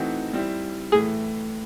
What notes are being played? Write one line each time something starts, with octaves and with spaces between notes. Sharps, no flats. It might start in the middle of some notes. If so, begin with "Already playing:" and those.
Already playing: E3 A3 C4 D#4 F#4
G3 C4 E4
A2 E3 A3 G#4